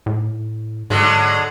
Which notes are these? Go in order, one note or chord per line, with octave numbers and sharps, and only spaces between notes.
A2
G#2 D3 F#3 G#3